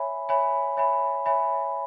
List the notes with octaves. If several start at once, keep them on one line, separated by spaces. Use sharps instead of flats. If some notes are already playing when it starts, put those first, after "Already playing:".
Already playing: C#5 E5 G#5 B5
C#5 E5 G#5 B5
C#5 E5 G#5 B5
C#5 E5 G#5 B5